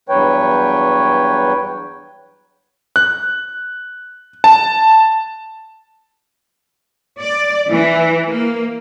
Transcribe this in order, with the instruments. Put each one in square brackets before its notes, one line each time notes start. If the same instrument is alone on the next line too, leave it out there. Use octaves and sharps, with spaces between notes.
[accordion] E2 G2 F#3 B4 C#5 G5
[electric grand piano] F#6
A5
[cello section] D5
E3
A#3